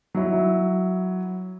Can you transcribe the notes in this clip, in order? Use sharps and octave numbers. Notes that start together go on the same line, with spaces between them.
F#3 E4